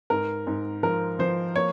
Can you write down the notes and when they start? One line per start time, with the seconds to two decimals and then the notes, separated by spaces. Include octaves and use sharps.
0.10 G#2 A#4
0.47 G#2
0.83 F3 A#4
1.19 F3 C5
1.56 A#3 C#5